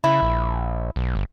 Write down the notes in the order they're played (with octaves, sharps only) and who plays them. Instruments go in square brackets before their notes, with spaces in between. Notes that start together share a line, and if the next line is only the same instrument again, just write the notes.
[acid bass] C#3 [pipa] E4
[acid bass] A#1
B1
G1